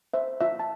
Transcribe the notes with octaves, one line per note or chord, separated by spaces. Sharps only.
C5 E5
F4 E5
A5